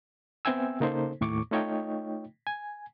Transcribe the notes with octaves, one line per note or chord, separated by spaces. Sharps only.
B3 C4 E5 G5 G#5 E6
C#3 A#3 D#4 A4 C5
D#2 A2 C#6 D6
A3 D#4 F4 C#5 D#5 G5
G#5